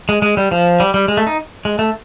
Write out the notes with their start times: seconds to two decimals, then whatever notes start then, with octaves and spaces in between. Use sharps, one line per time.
0.09 G#3
0.22 G#3
0.37 G3
0.51 F3
0.80 G3
0.94 G3
1.08 G#3
1.17 A3
1.27 D#4
1.65 G#3
1.79 A3